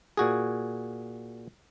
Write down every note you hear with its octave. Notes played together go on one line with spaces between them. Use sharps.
A#2 F#4 G#4